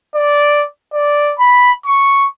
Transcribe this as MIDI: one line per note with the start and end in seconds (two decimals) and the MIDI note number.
0.15 0.64 74
0.94 1.33 74
1.39 1.71 83
1.85 2.24 85